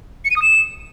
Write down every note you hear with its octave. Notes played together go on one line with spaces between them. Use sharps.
C#7
D#7
D#6
E7